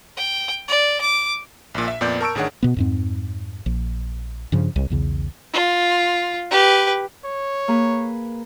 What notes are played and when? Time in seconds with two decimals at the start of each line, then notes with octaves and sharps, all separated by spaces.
0.17 G5
0.68 D5
1.01 D6
1.75 A#1 A#2
1.88 E5
2.01 F2 A#2 B3 D5 G6
2.21 A#4 A5 C#6 E6 D7
2.35 A1 D#3 D4 G#4 C#5 F#5
2.63 B2 B3
2.77 F2 G#2 C4
3.66 A#1
4.52 G2 C#3 F3
4.76 C2
4.90 B1 E2 C#3
5.53 F4
6.51 G4 B4
7.24 C#5
7.68 A#3 G#4 B4